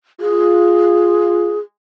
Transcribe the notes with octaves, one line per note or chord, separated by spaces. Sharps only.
F4 G#4